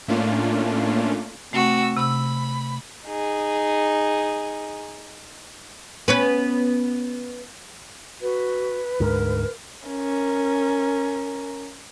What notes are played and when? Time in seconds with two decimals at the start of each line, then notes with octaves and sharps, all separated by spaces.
0.08 A2 A3 A#3 C#4 D4 F4
1.53 C3 A3 F#4 E6
1.97 C3 B5 E6
3.07 D#4 G#4
6.08 B3 C#4 B4
8.21 F#4 B4
9.00 D2 G#2 D3 A#4
9.88 C#4 A#4